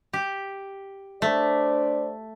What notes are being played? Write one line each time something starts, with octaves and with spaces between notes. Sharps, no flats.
G4
A3 D4 C5 D5